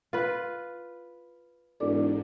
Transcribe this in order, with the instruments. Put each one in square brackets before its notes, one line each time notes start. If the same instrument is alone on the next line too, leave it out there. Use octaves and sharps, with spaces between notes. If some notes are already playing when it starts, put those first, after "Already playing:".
[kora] F4 B4
[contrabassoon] E1 [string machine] G#2 [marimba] A4 D5 D6